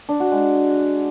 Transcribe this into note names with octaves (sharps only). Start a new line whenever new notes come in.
D4
F#4
G#3